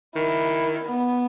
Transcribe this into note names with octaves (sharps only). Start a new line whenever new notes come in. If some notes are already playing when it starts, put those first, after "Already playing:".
D#3 E4
B3